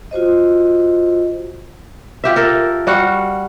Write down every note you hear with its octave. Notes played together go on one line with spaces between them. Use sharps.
F4 F#4 C5 D#5
F4 G4 E5
A4 A#4
G3 F#4 F5 F#5